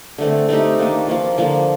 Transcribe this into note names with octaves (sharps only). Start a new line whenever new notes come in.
D3 A3 C4
A3 C4 D#4 G4
D#3 A#3 D4
F3 A#3 F4
D3 F3 A#3